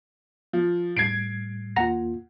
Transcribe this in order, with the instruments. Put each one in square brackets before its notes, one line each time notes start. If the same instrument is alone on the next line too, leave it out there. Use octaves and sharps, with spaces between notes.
[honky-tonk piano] F3
[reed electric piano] A2 G3 [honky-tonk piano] G#6 C7 D7
[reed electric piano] D#2 A#3 F4 [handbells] F#5 A#5 A#6